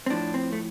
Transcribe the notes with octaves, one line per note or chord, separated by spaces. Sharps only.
C4
A2 F3 D4
C4
A3